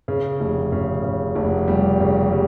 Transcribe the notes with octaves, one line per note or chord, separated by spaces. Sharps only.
C#3
F1
C#3
C#3
F1
G3
C#3
G3